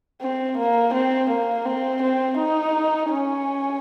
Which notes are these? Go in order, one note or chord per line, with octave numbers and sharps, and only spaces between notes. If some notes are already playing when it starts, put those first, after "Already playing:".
C4
A#3
C4
A#3
C4
C4
D#4
C#4